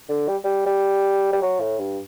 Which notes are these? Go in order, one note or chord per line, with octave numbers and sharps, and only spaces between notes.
D3
G3
G3
G3
G3
F#3
A2
G2